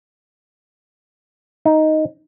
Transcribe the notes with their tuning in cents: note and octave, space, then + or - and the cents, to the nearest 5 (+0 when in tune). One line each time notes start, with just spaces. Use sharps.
D#4 +5